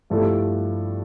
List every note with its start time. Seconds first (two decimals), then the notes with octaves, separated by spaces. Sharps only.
0.10 G2 F3 A3 E4 A4